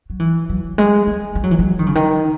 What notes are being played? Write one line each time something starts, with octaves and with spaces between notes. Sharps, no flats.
F#3
E3
F#3
G#3
G#3
G#3
F#3
E3
F#3
D#3
C#3
D#3